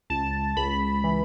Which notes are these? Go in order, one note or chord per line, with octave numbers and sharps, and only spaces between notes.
C#2 A5
C#2 B5
E3